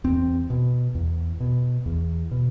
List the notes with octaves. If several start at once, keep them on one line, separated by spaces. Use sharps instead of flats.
E2 C4
B2
E2
B2
E2
B2